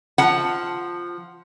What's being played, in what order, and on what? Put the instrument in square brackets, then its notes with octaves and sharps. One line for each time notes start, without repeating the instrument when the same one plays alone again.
[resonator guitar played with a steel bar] F3 F#5 A5